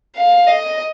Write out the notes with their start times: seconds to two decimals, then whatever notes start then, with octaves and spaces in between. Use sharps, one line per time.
0.17 F5
0.48 D#5